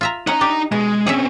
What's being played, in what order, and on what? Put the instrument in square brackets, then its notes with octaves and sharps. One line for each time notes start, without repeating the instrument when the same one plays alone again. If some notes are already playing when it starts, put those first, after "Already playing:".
[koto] F4 E5 A#5
[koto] C#4 F#5 [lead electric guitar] D#4 A#5
[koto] D4 G4
[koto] B2 [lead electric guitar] G#3
[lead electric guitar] C4 C#4 [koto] G#4 C#5 E5